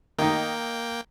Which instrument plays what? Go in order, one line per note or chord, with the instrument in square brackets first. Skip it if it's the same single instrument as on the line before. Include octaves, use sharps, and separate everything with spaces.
[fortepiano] D#3 D#4 [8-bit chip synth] A#3 G5